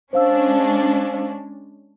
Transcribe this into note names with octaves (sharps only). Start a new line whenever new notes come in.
G#3 C#4 D4 C5 F5 E6